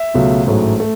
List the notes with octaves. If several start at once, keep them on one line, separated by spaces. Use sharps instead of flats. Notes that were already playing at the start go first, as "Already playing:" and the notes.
Already playing: E5
C#2 B2 F#3 A3
A1 G#2 F#3 A3
A3